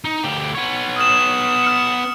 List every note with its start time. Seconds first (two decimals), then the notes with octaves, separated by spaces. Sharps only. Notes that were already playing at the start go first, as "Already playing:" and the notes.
0.04 D#4
0.24 D2 G4
0.55 B3 C#5
0.96 D#6 F6 E7
1.64 F6 C#7